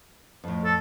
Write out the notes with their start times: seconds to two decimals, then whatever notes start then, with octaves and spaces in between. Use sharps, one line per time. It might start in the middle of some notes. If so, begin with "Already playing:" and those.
0.44 F2 A2
0.64 A4